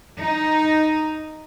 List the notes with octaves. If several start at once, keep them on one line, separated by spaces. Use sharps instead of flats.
D#4